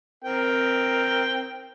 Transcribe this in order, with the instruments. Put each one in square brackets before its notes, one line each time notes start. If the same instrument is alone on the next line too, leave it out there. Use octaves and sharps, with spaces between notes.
[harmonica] C4 A#4 G5